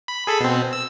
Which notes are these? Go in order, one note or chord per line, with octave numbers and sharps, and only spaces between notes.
B5
G#4 A4 B5
B2 C4
E6